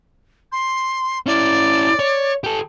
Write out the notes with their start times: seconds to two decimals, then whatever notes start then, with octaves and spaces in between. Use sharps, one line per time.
0.52 C6
1.26 C#4 E4 D5
1.99 C#5
2.44 G4 A4